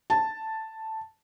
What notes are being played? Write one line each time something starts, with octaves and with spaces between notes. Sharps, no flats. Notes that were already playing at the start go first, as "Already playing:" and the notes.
A5